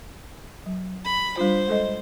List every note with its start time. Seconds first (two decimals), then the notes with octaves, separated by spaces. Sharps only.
0.66 F#3
1.04 B5
1.37 G3 D4 F4 C5
1.68 G#3 A4 D#5